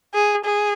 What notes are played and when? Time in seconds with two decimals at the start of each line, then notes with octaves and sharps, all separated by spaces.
0.14 G#4
0.44 G#4